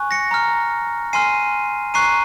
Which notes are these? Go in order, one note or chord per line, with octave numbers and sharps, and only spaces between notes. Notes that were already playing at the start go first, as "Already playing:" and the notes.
Already playing: G#5 C#6 F#6
A#6 C#7
A#5 F6
G#5 C6 F6 C7 D#7
A#5 C#6 F#6 C7 D#7